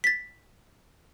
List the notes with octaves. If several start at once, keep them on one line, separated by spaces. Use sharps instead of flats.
A6 B6